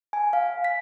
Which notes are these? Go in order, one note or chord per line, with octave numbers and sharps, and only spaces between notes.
G#5
F5
B6